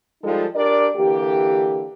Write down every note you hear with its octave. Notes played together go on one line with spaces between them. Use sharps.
F3 G3 G#3 D#4 F4 A4
D4 G4 A#4 D5
D3 E3 A#3 G4